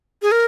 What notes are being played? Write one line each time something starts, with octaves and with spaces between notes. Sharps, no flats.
G#4
A#4